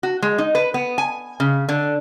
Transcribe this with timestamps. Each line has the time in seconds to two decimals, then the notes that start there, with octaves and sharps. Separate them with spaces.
0.03 F#4
0.22 G#3
0.38 D#4
0.55 B4
0.74 B3
0.98 G#5
1.40 C#3
1.69 D3